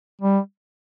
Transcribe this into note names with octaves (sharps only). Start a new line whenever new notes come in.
G3